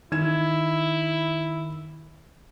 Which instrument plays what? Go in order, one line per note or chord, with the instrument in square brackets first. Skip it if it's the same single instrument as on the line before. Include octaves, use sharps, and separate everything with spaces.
[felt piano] D#3 G#6 E7 [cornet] E4